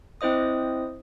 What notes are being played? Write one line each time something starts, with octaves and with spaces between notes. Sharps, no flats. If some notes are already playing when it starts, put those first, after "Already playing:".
C4 E4 C5 D#5 D#6